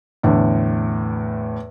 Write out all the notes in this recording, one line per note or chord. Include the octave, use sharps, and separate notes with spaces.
E2 A2 D3